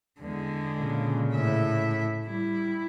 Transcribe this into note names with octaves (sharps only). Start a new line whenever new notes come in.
E2 D3 G#3
A#2 C#3
A2 E5
G3 E4